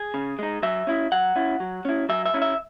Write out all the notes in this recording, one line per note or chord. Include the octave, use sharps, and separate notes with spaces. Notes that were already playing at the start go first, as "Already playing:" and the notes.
Already playing: G#4
C#3
G#3 D#4
F#3 E5
C#4 E4
F#3 F#5
C#4 E4
F#3
C#4 E4
F#3 E5
E5
C#4 E4
E5